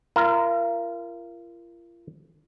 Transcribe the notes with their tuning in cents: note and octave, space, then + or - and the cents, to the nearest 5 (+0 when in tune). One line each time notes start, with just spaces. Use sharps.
F4 -40 A#4 +0